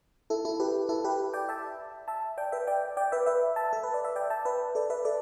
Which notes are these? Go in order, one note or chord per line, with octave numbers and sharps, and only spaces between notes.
E4 A4
E4 A4
G4 B4
E4 A4
G4 B4
D5 G5
E5 A5
E5 A5
D5 G5
B4 E5
D5 G5
D5 G5
B4 E5
B4 E5
E5 A5
A4
B4
D5
E5
D5 G5
E5 A5
B4 E5
A4 D5
B4 E5
A4 D5